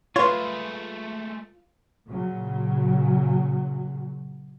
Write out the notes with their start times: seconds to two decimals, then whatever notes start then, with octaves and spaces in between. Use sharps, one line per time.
0.16 G#3 A3 F4 B4 C#5 C6 C#6
2.07 A#2 C#3 F#3